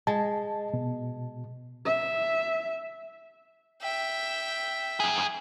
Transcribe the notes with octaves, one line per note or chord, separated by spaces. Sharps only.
G#3 A5
B2
E5
E5 G5
F#2 G#4